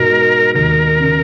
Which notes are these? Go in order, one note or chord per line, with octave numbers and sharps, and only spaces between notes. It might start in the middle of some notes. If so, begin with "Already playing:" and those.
Already playing: G#2 B2 A#4
G#3
D#2 A#4
C#3